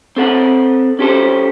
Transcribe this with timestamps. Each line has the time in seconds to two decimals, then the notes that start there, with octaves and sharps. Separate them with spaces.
0.16 C4 A4 F#5
0.99 C#4 G4 A4 C5